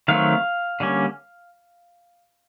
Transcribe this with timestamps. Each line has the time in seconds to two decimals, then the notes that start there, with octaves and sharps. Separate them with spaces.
0.08 D#3 F#3 A3 C4 F5
0.80 D3 G3 A#3 C#4